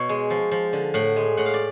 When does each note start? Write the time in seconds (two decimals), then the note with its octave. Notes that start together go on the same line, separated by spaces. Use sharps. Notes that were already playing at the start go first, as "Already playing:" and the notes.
Already playing: B2 C#5
0.09 G#3
0.30 F3
0.51 F3
0.73 D3
0.94 A2 F#5
1.16 G#3
1.37 A2 F#5
1.46 F5
1.54 D5